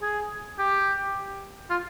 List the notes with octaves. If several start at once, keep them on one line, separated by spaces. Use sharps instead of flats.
G#4
G4
F4